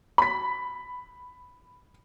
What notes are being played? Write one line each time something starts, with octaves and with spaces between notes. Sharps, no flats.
B5 B6